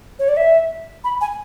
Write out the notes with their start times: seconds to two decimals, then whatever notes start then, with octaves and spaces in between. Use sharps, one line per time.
0.19 C#5
0.28 D5
0.37 E5
1.04 B5
1.21 G#5